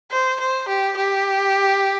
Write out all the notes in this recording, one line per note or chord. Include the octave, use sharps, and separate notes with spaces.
C5
C5
G4
G4